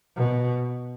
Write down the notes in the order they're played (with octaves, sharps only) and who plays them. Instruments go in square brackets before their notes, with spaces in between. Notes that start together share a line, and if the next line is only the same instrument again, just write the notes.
[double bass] B2